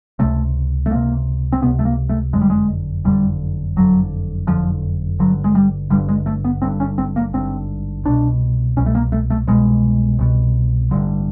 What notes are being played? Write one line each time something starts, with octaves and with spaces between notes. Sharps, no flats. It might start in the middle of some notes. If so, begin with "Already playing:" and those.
C#2 C3 A3
A3
C#2 C3 A#3
C4
C#2 C3 B3
A3
A#3
A3
F#1 F2 D3 G#3
G3
G#3
F#1 F2 D3 G3
F#1 F2 D3 F#3
F#1 F2 D3 F3
G#1 G2 D3 F#3
G#3
G3
G#1 G2 D3 G3
G#3
A3
B3
G#1 G2 D3 C4
C#4
C4
A#3
G#1 G2 D3 C4
C2 B2 D4
C2 B2 C#4
A3
A#3
A3
A3
C2 B2 G#3
C2 B2
A1 G2 D3